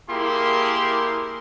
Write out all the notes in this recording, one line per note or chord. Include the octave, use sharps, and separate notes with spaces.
A#3 E4 G4 G#4 A#4 C6